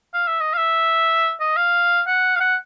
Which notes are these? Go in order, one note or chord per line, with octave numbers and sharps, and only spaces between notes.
F5
E5
D#5
F5
E5
D#5
F5
F#5
F5
F#5